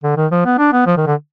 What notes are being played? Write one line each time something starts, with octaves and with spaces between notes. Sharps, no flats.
D3
D#3
F3
B3
D4
B3
F3
D#3
D3